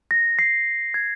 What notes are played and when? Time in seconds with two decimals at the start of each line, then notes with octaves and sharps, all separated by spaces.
0.11 A#6
0.39 C7
0.94 G#6